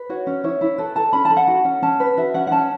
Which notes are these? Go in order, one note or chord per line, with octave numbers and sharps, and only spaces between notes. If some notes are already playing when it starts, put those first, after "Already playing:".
Already playing: B4
F#4 C#5
C#4
E4 C#5
E4
A4 B4
A4 A5
C#4 B5
A5
A4
F#5
F#4
C#4
C#4 A5
B4
F#4 E5
C#4 F#5
F#5
C#4 A5